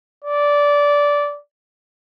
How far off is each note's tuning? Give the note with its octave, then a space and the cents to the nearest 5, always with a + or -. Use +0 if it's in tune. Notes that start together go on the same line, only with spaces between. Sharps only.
D5 -15